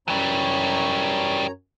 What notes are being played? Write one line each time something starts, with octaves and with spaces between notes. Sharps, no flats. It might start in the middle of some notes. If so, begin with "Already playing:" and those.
F#2 E3 G3 C#5 A#5